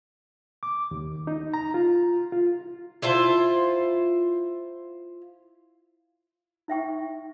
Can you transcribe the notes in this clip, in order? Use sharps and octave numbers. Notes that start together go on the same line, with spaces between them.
D6
D#2
D#4
A#5
F4
F4
E4 F4 C5 A5
D#4 E5 G5 C#6